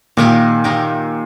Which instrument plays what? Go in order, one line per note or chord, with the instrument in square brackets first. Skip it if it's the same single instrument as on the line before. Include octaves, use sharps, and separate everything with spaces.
[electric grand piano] A#2 [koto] D#3 A#3 D#4 G4
[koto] D#3 A#3 D#4 G4